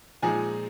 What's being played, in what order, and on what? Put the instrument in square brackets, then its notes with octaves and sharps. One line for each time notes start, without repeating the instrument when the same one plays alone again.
[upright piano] A#2 F3 G#3 D#4 G#4 G#5